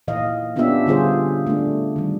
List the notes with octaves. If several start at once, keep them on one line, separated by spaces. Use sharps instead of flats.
A#2 E3 D#5 F5
B3 C#4 D4 F4 G4 E5
D3 G3 F4 G#4 C5
A3 D4
D#3 G3